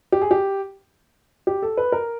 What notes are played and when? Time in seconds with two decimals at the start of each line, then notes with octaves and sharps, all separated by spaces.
0.12 G4
0.22 G#4
0.31 G4
1.47 G4
1.62 A4
1.77 B4
1.92 A#4